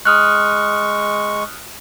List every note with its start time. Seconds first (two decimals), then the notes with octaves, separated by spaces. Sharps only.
0.05 G#3 C#6 D#6 F6 F#6